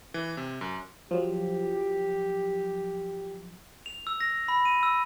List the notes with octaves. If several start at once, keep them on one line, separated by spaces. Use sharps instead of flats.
E3
C3
F#2
F3 F#3 G4
F7
E6
A#6
B5
D#7
E6